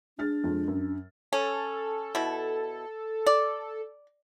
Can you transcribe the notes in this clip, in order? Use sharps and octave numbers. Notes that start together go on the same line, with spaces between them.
D4 G#4 F6 A6
F2 G#3
F#2
C#4 A4
B2 E4
D5